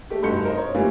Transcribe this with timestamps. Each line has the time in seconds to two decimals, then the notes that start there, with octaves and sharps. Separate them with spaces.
0.10 A3 G4
0.22 F1 G2 D#4 F#4 G6 C#7
0.45 A#4 C5 D#5
0.57 C#5
0.75 A2 E3 G3 A#3 C#4 F4